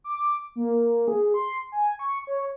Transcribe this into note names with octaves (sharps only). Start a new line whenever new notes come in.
D6
A#3
G#4
C6
G#5
C#6
C#5